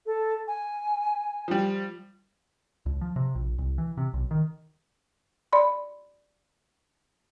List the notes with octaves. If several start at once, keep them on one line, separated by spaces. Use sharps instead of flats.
A4
G#5
F3 G3
C#2
F3
C3
A#1
C2
E3
C3
B1
D#3
D5 B5 C6